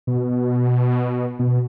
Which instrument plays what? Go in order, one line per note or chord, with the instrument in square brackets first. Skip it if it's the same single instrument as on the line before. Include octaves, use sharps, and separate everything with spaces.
[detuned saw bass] B2
B2